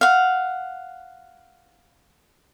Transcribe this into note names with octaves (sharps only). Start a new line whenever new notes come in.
F5 F#5